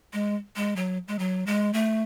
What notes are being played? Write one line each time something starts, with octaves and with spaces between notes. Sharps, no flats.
G#3
G#3
F#3
G#3
F#3
G#3
A3